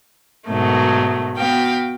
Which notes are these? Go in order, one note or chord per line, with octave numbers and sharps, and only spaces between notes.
G#2 B2 D#3 F#3 A3
B3 F#4 F5 G5